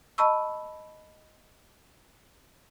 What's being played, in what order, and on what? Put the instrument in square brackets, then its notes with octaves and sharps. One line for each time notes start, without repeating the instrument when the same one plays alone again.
[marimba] D#5 A5 B5 C#6 E6